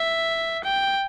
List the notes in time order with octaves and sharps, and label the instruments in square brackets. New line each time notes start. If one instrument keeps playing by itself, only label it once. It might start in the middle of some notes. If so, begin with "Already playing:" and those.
Already playing: [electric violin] E5
G5